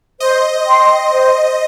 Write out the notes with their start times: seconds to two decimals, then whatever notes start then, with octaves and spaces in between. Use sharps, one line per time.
0.20 C5 D#5
0.67 G5 C6
1.12 C5